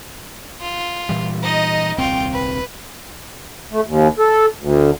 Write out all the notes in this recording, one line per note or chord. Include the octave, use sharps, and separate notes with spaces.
F4
A#2 E3 G3
D#4 D#5
D#1 C2 C4 F4 G5
B4
A3
D#2
A4
D2